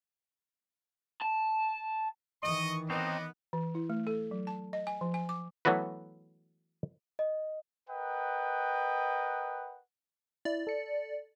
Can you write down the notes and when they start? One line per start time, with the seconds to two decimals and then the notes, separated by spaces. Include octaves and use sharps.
1.22 A5
2.43 D#3 E3 D#5 C#6
2.90 B3 C4 D#4 D#5 D6
3.53 E3
3.75 E4
3.90 A3
4.07 A4
4.31 F#3
4.47 A5
4.73 D#5
4.87 G#5
5.01 F3
5.14 G#5
5.29 D6
5.65 E3 F#3 A3 B3 F#4 B4
7.19 D#5
7.90 A#4 B4 D#5 F#5 G5
10.45 E4 D5
10.67 A4 C#7